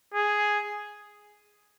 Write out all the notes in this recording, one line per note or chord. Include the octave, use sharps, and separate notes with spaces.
G#4